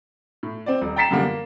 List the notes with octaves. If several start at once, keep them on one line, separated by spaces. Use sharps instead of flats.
A2
C4 D5
D#1
G5 A#5 A6 B6 C7 E7
F#2 D3 G3 A#3
A#3